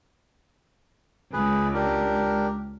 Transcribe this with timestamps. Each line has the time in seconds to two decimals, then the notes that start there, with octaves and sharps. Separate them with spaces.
1.33 C#2 G#4 B4
1.74 D4 G4 A#4